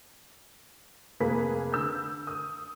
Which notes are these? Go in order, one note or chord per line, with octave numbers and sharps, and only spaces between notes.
F1 A#3 G#4 B4 B6
D3 E6 G6
D#6